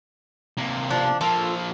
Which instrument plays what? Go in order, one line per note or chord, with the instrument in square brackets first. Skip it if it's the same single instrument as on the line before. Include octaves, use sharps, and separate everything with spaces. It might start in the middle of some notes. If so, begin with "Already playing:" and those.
[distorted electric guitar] C3 A#3
[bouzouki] F3 D4
[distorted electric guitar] F3 A#3 [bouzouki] F4 A4